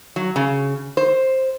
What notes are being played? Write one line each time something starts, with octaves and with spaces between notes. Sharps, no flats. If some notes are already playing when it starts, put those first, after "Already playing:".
F#3
C#3
C5